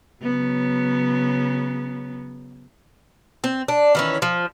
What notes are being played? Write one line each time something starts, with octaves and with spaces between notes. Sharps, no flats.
C#3 F#3 B3
C4
D4
D#3 E3 C#4
F3